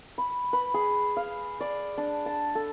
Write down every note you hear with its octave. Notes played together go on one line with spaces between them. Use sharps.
B5
B4
G#4
F5
D5
D4
A5
A4